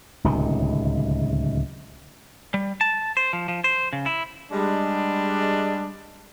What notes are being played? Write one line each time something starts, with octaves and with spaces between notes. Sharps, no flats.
D1 C#2 C3 D#3
G3
A5
C5
F3
F3
C5
C#3
E4
G3 G#3 D4